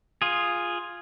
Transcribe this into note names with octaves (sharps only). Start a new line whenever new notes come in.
F4 G#4